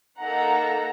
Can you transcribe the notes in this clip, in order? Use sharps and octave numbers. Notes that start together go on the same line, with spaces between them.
A#3 D#4 A4 F#5 A#5